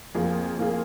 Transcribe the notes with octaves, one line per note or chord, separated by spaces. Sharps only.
F2 F3 A#3 F4 G#4
F2 F3 A#3 F4 G#4